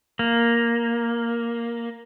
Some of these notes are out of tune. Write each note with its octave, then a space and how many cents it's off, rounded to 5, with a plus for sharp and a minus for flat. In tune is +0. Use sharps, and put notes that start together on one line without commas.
A#3 +5